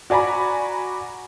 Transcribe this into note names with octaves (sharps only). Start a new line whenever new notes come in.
F#4 D5 G#5 A#5 B5